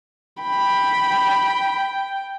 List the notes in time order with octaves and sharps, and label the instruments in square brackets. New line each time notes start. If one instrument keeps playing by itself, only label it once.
[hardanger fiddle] G5 [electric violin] B5